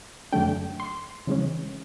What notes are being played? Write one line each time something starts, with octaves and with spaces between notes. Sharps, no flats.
F#2 D3 F#3 A3 D4 G5
C6
C#3 E3 G#3 C#4